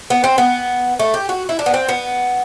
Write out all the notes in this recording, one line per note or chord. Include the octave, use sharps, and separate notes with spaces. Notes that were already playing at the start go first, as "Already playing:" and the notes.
B3
C4
B3
A3
G4
F#4
E4
D4
B3
C4
B3